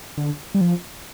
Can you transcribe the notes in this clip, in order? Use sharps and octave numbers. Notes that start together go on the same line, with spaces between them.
D3
G3
F3